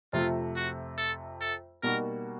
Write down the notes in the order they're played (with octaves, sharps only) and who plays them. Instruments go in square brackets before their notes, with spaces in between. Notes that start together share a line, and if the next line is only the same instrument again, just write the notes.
[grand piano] F2 C3 F3 A3 [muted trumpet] F4
[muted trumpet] F#4
A4
A4
[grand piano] B2 G3 A#3 D#4 F#4 [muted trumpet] A#4